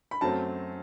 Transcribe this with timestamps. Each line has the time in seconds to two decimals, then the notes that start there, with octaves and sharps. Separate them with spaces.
0.11 B5
0.21 F#2 F#3 A3 C4 A5